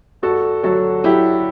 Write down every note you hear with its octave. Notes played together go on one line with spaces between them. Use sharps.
G2 F#4 A4
F#3 F#4 A4
F#3 E4 G4